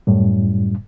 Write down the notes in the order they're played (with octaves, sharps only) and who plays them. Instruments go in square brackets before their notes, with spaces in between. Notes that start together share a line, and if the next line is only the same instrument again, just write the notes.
[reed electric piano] F#2 A2 G3